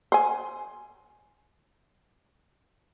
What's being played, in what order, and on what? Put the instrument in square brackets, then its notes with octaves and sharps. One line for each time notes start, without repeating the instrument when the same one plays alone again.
[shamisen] C5 G#5